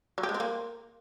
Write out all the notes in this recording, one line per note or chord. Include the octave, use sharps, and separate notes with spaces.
F#3
G4
G#3
C4
A#3